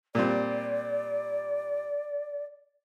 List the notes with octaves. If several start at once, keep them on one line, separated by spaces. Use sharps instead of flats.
A#2 G3 C4 D5